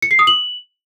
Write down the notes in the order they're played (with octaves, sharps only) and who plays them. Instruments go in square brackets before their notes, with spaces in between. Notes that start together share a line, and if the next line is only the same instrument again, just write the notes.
[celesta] C#7
C7
D#6
F#7